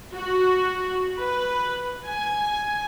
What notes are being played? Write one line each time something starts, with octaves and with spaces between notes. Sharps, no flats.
F#4
B4
G#5